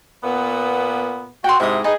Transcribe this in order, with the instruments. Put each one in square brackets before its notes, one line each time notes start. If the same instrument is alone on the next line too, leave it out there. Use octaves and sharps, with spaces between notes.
[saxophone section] A#2 B3
[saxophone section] F#4 [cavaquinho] G5 C6
[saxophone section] G#2 C3 G#3 [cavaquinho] E4 D#6
[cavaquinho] D#4 B4 G#5 [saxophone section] G#4